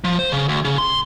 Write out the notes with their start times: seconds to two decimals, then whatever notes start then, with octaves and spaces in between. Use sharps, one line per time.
0.04 F3
0.19 C5
0.32 C#3
0.48 D2
0.65 C#3
0.78 C6